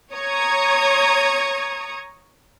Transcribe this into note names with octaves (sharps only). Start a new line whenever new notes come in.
C#5 A#5 C#6 D#6 G#6